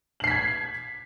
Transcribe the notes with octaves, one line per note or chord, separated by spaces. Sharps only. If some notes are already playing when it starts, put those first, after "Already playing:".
G#6 B6 C7 F#7